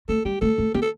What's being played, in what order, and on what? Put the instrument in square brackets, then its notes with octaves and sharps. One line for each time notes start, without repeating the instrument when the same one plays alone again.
[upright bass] A3 [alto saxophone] A4
[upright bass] G3 [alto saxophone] G4
[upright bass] A3 [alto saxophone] A4
[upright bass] A3
[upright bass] B3 [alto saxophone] G4
[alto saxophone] A4